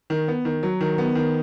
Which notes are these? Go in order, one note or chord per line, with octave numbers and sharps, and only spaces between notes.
D#3
B3
D#3
F#3
D#3
B3
D#3